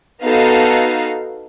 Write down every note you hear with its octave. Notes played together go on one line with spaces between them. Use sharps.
B3 D#4 F#4 A4 F5